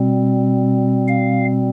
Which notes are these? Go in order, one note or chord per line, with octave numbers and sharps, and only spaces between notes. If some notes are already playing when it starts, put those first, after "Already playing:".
Already playing: B2 G3 C4
F5